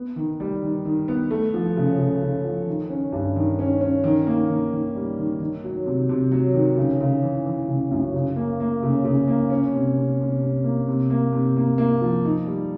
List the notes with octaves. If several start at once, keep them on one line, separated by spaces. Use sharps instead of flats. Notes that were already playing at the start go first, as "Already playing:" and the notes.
Already playing: B3
D#3
G3
D#3
D#3
B3
A3
F3
C#3
C#3
C#3
F3
D#3
C#4
G2
D#3
C#4
C#4
D#3
A#3
D#3
D#3
G3
D#3
D#3
F#3
C3
C3
F#3
D#3
C#3
C#3
E3
E3
C#3
F#2
C#3
A#3
A#3
C#3
C#3
A#3
C#4
C3
C3
C3
C3
A#3
C3
A#3
C3
A#3
A#3
F3
D#4
G3